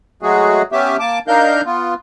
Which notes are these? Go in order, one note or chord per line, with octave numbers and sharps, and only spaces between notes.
F#3 G#3 A3 F#4 G#4
B3 C#4 G4 E5
A#3 A5 D6
D4 D#4 A#4 F5 G6
B3 F4